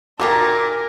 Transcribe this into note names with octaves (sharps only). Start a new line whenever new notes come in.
A#2 D#3 F4 F#4 A#4 A#5 D6